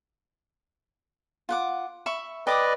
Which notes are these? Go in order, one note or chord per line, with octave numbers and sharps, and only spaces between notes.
F4 F#5 D6
E5 B5 C#6
B4 D5 D#5 G5 D6 D#6